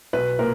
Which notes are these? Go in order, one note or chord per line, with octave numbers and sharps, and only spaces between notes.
B1 B4
A#2 A#4